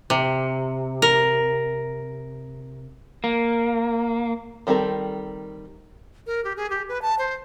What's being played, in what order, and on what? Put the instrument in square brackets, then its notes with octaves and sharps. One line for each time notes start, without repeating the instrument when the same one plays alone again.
[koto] C3
A#4
[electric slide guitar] A#3
[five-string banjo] D#3 G3 C4 A4 A#4
[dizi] A#4
G4
G#4
G4
B4
A5
C5